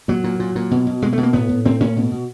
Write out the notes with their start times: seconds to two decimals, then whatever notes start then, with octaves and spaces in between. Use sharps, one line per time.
0.08 A#2 F#3
0.24 A#2
0.39 A#2
0.55 A#2
0.71 B2
0.87 B2
1.02 B2 G#3
1.13 A3
1.17 B2
1.23 A#3
1.33 A2 B3
1.49 A2
1.65 A2 C4
1.80 A2 C#4
1.96 B2
2.11 B2